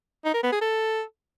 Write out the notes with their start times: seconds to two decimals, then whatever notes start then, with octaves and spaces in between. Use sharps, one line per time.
0.25 D#4
0.34 A#4
0.43 B3
0.52 G#4
0.61 A4